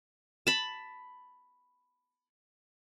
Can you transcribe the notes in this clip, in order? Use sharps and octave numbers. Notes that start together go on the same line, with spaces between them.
A5 B5